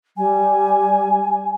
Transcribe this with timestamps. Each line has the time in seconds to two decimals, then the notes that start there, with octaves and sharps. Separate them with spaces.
0.17 G3 G#5